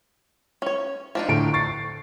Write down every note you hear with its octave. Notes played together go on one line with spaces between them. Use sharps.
C#4 C#5
F3 D4 D#4
A2 D3 D7
C#6 A6 C7